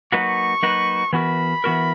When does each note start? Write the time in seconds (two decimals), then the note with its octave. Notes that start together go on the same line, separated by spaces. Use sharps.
0.12 F#3 A#3 D#4 F#4 B4 C#6
0.63 F#3 A#3 D#4 F#4 B4
1.13 E3 B3 F#4 A#4 B5
1.64 E3 B3 F#4 A#4